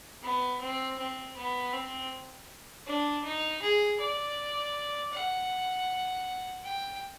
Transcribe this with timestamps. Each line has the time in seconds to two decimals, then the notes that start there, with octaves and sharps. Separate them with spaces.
0.23 B3
0.61 C4
0.98 C4
1.36 B3
1.73 C4
2.87 D4
3.24 D#4
3.62 G#4
4.00 D5
5.13 F#5
6.64 G5